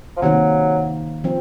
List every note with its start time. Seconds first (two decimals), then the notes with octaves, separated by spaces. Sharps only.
0.17 F3
0.22 C3 D#3 F#3 A#3
1.24 F3 C4